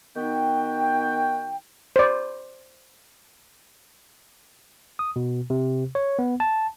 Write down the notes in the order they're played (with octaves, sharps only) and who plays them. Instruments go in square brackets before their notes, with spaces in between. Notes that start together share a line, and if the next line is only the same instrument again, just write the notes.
[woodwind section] D#3 B3 D#4 F#4 G5
[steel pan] C5 D5
[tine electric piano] D#6
B2
C3
C#5
B3
A5